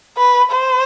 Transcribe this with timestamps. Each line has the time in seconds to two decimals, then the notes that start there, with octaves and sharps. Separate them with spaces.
0.18 B4
0.52 C5